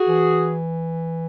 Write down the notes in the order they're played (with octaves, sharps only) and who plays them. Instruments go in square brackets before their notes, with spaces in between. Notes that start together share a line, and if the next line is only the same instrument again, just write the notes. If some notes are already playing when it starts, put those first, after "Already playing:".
Already playing: [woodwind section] F#4 G#4
[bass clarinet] E3